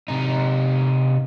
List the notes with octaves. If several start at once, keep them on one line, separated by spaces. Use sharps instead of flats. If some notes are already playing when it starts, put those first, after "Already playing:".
C3 D#4